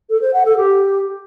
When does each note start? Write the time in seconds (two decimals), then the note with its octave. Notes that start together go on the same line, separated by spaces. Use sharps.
0.09 A4
0.21 C5
0.33 F#5
0.45 A4
0.57 G4